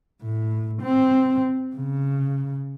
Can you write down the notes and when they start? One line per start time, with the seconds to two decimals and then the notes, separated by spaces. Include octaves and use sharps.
0.22 A2
0.82 C4
1.76 C#3